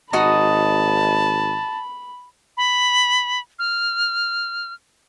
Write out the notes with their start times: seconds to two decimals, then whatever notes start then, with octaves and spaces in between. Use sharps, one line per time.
0.13 G#1 D#4 F#4 D#5 A5 B5
2.57 B5
3.59 F6